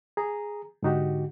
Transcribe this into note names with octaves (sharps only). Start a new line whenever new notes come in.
G#4 A#5
G#2 D3 D#4 F#4 G4